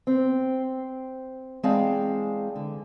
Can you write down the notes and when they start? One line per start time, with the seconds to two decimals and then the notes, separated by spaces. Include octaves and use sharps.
0.07 C4
1.63 E3 G#3 C4 D5 F5 A5
2.56 D3